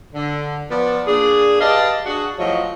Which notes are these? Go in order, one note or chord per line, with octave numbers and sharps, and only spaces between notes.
D3
F3 B3 D5
A#2 A#3 D4 G#4
G4 B4 D5 D#5 F5 A5
D4 F#4 G#4
A2 F3 F#3 C#5 D#5